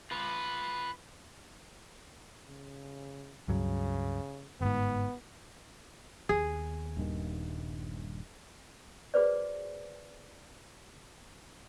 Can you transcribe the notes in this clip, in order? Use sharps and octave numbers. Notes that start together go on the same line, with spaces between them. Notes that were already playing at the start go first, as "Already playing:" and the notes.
F4 B4
C#3
C#2 G2 C#3 F#3
G1 G#2 B3
D#2 B3 G#4
D#1 G2 D#3
F#4 G#4 B4 C5 D5